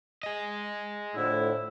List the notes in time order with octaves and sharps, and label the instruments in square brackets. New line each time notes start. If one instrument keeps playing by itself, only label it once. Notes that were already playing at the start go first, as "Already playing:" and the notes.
[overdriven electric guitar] G#4 D#5
[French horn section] A2 [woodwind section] D3 F3 E4